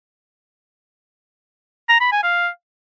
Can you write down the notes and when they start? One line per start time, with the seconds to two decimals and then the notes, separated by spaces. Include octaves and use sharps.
1.89 A#5
2.00 B5
2.12 G#5
2.23 F5